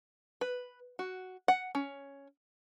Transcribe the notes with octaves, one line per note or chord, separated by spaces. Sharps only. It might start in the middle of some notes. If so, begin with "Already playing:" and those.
B4
F#4
F#5
C#4